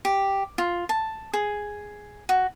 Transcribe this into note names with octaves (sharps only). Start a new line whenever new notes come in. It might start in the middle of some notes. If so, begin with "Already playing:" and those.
G4
F4
A5
G#4
F#4